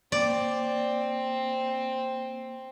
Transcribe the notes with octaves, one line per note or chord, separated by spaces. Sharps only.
A#3 C4 D5